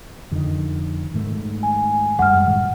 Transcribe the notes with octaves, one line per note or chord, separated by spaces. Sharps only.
F2 D3 D#3
G#2 D#3 A3
G#5
F#2 G3 G#3 F#5 F6
A2 D#3